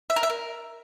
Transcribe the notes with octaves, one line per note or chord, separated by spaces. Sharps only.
E5
A#4
E5
A#4